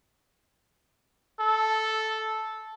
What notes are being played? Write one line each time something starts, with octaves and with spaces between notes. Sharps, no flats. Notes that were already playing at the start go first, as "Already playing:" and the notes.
A4